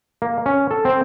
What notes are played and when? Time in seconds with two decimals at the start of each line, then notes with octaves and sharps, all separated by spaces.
0.22 A#3
0.46 C#4
0.71 A4
0.85 C4